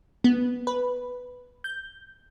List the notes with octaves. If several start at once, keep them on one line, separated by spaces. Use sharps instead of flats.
B3
B4
G6